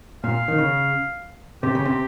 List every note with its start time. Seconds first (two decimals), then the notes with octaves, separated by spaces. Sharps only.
0.24 A#2 F5
0.48 D#3
0.58 C#3
1.63 C3 G4
1.75 C#3
1.85 C3